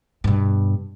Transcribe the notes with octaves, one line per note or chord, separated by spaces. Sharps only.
G2 B2